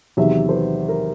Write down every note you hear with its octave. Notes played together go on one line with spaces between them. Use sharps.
E2 C3 D#3 F#3 E5
C5
B4
A#4